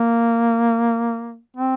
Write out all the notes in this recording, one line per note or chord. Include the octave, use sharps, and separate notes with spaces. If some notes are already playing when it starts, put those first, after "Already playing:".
Already playing: A#3
C4